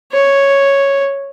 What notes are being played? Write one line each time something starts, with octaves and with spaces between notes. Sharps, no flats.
C#5